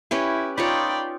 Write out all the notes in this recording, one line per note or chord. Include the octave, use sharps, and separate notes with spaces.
C#4 E4 G4 B4
D#4 F4 C#5 D5 G5 B5